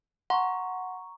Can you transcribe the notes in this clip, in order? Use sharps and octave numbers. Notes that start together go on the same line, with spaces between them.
F#5 A#5 C6 C#6